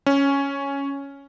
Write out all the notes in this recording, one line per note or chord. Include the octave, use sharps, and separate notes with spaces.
C#4